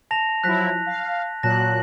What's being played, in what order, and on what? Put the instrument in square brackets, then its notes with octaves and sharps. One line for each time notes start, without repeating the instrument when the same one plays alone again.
[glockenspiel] A5 A#6 F7
[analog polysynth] F3 F#3 E4 [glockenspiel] F#6 A#6 B6
[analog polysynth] F5
[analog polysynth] A#2 F#3 F#6 [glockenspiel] A5 A#6